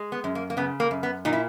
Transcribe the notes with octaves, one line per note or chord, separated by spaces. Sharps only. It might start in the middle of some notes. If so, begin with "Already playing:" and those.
Already playing: G#3
B3
F#2
A#3
A#3
C#3 B3
A#3
F#2
B3
A#2 D#4
E4